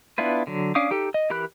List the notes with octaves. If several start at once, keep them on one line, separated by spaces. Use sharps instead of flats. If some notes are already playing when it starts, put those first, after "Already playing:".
B3 D4 E4 F4 B4
D3 F#3
C#4 D4 F5 D6 D#6
D#4 G4 A4
D#5
E3 G4 A#4 B5 F#6